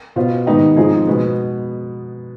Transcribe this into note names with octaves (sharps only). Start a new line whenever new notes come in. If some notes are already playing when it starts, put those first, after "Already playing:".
B2 B3 F4 C5
G#2 D#3 B3 D#4 G4
G#2 F3 C4 D#4 G#4
B2 G#3 B3